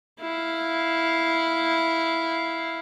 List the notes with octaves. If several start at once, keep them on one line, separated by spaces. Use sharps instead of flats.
E4 F5